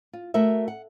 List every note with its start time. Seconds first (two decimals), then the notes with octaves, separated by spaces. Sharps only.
0.13 F4
0.34 A3 F#4 A#4 E5
0.68 F#5